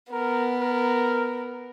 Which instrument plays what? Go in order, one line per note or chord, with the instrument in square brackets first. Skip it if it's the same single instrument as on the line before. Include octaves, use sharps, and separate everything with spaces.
[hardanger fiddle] B3 [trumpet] A#4
[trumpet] A#4